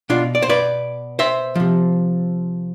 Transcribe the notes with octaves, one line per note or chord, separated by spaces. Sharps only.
B2 D4 F4
D5
C5
B4 D5
C5 E5
C3 F3